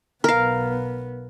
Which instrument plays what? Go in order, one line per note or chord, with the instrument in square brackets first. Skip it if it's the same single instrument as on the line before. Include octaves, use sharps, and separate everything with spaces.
[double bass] B1 B3 [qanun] A#4 F5